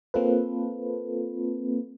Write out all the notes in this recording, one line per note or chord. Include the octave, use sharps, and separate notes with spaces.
A#3 C4 F4 A4 B4